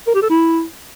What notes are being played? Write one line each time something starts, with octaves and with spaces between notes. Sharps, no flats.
A#4
G4
A4
E4